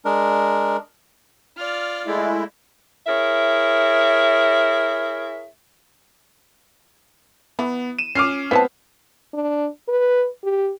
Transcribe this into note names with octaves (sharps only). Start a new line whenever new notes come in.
G#3 D4 A#4
F4 D5 F6
G#3 A3 E4
E4 G#4 A#4 C#5 E5
E3 B3 E4
D#7 E7
C#4 D6 F6 C7
B3 C4 E4 C#5 A5 B6
D4
B4
G4